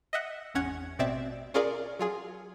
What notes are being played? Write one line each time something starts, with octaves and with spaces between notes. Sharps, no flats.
D#5 E5 F#5
G#1 E2 C#4 F#5 G#6
A1 B2 C4 D5 E5 A6
C#4 F4 G#4 A#4 D5
F#3 F4 G#4